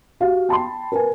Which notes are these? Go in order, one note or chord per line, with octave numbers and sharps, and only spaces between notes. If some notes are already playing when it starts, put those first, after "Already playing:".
F#4 G4 F5
G5 A5 B5 C6
A#4 B4 G#5